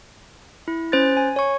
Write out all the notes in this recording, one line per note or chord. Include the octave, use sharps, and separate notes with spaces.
E4
C#4 C5 F#6 A6
G#5
C#5 C#6